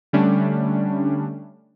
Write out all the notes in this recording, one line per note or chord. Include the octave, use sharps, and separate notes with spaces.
D3 G3 A3 C#4 D4